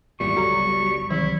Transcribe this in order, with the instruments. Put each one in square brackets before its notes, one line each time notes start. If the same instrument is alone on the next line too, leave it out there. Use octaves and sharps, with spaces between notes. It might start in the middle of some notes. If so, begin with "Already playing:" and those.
[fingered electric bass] G#1 E2 A#2 [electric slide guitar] G3 [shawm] C#6
[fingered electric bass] G1 C#2 F#3 [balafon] F#4 A4 A#5
[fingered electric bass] C2 [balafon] D#3 E3 F#3 [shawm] E4